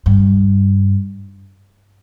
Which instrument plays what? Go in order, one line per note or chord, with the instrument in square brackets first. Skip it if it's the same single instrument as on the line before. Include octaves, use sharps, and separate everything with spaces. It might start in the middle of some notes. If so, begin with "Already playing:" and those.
[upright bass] G2